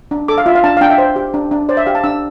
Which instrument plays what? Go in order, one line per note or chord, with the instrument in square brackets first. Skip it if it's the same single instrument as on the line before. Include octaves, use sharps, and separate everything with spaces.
[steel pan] D4
A4 D6
F5
F4 E5
F5
D4 A5
F5
D4 G5
E5
C5
G4
D4
D4
C5 D5
E5
G4 F5
A5
D4 E6